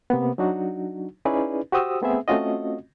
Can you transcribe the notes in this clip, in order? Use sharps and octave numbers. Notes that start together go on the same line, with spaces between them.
C3 A#3 B3
F#3 D4 D#4 F#4
C#4 D#4 E4 G#4 B4 D5
F#4 G4 C5 D#6 E6
A3 B3 C4 G#4 E5
A3 C4 C#4 F4 F#4 D#5